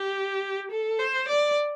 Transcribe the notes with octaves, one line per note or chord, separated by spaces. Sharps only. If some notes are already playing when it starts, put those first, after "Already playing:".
Already playing: G4
A4
C5
D5